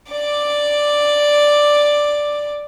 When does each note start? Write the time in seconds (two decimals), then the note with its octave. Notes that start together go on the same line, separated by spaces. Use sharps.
0.10 D5 D6